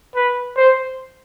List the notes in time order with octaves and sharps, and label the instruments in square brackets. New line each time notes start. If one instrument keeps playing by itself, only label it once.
[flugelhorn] B4
C5